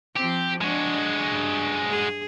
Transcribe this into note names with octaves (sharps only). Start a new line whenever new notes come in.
F3 C4 G4
G#3 D4 F#4
G2
G#4